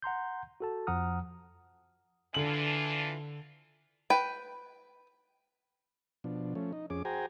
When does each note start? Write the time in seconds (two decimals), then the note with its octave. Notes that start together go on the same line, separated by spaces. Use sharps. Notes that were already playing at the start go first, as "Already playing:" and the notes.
0.02 F#5 A#5 C6 G6
0.60 F#4 A4 A5
0.87 F2 F3 F#5 A#5 D#6 F6
2.34 D3 E3 D4 F4 F#7
4.10 B4 G5
6.24 B2 F3 D4
6.55 F3 A3 C#4
6.73 D#4
6.90 F2 C#4 G#4 D6
7.05 F#4 G#4 C5 G5 G#5 A#5